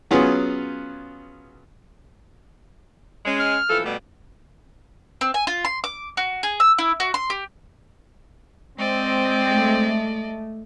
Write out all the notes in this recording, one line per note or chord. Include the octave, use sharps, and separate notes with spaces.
F#3 B3 C#4 F4 G#4
G#3 C#4
F6
E3 F3 A4
B2 G3 A3
C4
G#5
F4
C6
D6
F#4
G#4
E6
E4
F#4
C6
G4
G#3 C4 D5 D#5
A3